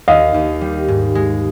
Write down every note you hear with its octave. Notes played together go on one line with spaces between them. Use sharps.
D#2 D#5 F5
D#2
G3
G#2
G#3